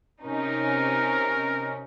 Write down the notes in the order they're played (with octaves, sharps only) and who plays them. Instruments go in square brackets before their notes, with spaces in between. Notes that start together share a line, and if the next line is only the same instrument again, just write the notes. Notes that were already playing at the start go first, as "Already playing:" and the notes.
[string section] C3 C#4 D#4 [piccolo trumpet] A#4